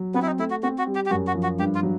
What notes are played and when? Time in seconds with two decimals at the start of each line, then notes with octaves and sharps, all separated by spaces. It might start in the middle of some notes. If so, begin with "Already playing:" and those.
Already playing: F#3
0.14 B3 C4
0.22 E4
0.26 D#4
0.39 A3 E4
0.50 F#4
0.63 C4 F#4
0.78 F#4
0.87 G3
0.95 G4
1.06 G4
1.11 F#2 F#4
1.27 F#4
1.35 F3
1.43 F#4
1.59 G2 G4
1.75 F4
1.83 F#3